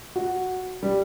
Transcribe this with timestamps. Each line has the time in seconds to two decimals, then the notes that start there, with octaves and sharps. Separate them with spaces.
0.16 F#4
0.83 G3